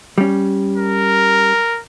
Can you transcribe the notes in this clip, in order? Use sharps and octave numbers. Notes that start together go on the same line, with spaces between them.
G3 C#4
A#4